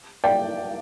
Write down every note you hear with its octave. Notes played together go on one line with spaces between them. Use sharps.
D5 G5